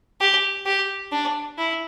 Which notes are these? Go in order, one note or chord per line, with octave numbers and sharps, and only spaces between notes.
G4
G4
D4
E4